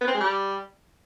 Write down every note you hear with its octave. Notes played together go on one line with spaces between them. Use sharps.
B3
C4
G#3
G3